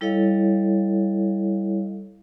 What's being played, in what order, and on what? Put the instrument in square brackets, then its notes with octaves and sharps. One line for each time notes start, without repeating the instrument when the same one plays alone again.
[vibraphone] G3 E4 A4 C#5 D#5 F5